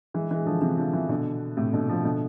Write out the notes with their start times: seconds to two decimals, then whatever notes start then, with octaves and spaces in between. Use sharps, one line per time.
0.14 E3 G#3
0.30 E3 G#3
0.46 D3 F3
0.61 C3 E3
0.77 D3 F3
0.93 C3 E3
1.09 B2 D3
1.57 A2 C3
1.73 B2 D3
1.89 D3 F3
2.04 B2 D3